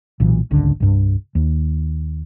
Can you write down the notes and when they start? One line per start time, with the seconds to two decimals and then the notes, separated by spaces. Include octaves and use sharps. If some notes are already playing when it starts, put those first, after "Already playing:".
0.20 B1 A#2 E3
0.50 D#1 G#1 C#2 D3
0.80 C2 G2
1.35 D#2